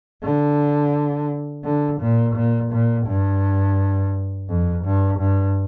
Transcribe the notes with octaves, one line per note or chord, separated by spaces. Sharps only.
D3
D3
A#2
A#2
A#2
G2
F2
G2
G2